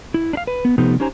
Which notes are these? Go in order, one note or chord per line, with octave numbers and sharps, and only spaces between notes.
E4
D4 F5
B4
B3
C3 F3 A3 B3 D#4 G4
C#4 D#4 G4 C5 G#5 A#5